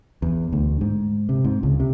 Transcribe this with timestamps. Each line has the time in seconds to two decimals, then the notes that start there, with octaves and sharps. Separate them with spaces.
0.22 E2
0.52 D2
0.81 G#2
1.29 C3
1.44 G#2
1.63 C#2
1.80 C3